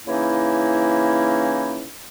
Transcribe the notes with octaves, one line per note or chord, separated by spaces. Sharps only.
C#3 E3 A#3 C#4 D#4 E4